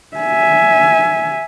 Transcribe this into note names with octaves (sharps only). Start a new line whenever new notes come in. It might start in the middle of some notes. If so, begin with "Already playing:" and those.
E5 G#5